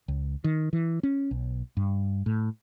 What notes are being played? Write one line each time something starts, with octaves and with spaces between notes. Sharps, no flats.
C#2
D#3
E3
C#4
B1
G2
A2